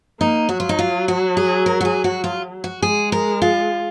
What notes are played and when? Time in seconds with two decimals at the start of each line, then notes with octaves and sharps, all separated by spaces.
0.20 A#3 D#4
0.49 F#3 F#4
0.60 F4
0.69 D#4
0.79 F4
1.08 F#4
1.37 G#4
1.66 A#4
1.81 F#4
1.85 G#4
2.04 F#4
2.24 F4
2.64 F#4
2.82 G#3 G#4
3.12 A#4
3.42 F4